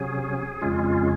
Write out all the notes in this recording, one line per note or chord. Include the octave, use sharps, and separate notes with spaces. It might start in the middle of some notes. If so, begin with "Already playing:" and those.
Already playing: C3 F#3 C#4 G#4
F2 C#3 G#3 C#4 F4
F4